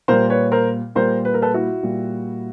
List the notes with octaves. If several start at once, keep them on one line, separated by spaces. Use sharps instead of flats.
A#2 G3 A#4 C5
B4 C#5
A#4 C5
A#2 G3 A#4 C5
B4
A#4
A4 B4
E4 F#4
A#2 G3